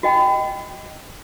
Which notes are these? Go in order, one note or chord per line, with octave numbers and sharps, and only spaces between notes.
F#4 D#5 G5